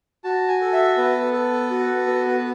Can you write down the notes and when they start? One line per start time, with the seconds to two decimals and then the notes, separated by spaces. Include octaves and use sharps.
0.24 F#4 A5
0.48 G#5
0.61 A4
0.73 E5
0.97 B3 B4
1.33 A4
1.70 F#4
2.07 B3